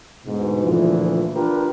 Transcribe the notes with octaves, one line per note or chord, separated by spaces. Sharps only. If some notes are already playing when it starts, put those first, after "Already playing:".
D2 G#2 B2
D2 A#2 E3 F3
D4 F4 G4 A#4 B4